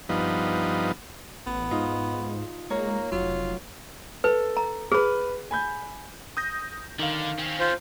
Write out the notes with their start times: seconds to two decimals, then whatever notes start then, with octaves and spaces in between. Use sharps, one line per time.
0.09 G2 F3 B3 D#4
1.47 A1 B3
1.71 G#2 D#4 F4
2.70 G#3 A#3 C#5 A#5
3.12 F1 F#3 F4
4.24 A4 B4
4.57 A#5
4.92 G#4 B4 F6
5.51 G#5 B5 G6
6.37 D#6 G6 A#6
6.99 D3 D#3 F5
7.38 C4 C#4
7.60 F4 C5